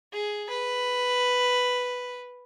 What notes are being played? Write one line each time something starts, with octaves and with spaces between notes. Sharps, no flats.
G#4
B4